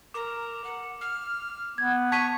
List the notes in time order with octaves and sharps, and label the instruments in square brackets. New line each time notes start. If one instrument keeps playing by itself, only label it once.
[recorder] A#4 [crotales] D6
[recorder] F#5
F6
[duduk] B3 [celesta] G#6
[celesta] A5 [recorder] C#6 [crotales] G#6 B6 D#7